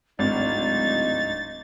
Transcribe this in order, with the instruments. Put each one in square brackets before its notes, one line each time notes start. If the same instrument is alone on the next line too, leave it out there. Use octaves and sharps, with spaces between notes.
[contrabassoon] D1 [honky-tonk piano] G#1 [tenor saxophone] D#4 [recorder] A6